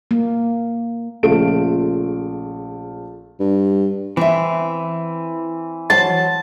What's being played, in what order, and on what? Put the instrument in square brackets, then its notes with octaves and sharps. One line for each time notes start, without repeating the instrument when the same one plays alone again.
[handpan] A#3
[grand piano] A#1 C#3 A3 F4 D7
[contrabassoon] G2
[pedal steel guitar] E3 [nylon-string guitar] C4 E5
[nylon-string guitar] F#3 C5 [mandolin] A5